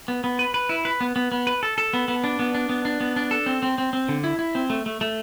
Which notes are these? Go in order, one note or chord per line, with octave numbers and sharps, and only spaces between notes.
B3
B3
B4
B4
E4
B4
B3
B3
B3
B4
A4
A4
B3
B3
D4
B3
D4
B3
D4
B3
D4
A4
C4
C4
C4
C4
D3
E4
E4
C4
A3
A3
A3